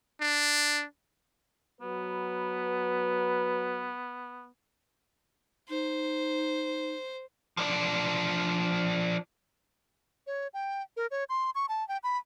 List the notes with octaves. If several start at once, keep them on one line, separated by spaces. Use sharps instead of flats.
D4
F#3 B3 B4
D#4 C5
F3 D4
C#5
G5
A#4
C#5
C6
C#6
A5
G5
B5